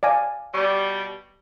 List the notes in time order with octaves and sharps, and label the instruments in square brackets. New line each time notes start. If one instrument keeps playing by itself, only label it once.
[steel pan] D5 F5 G#5
[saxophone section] B2 G3 [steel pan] C#6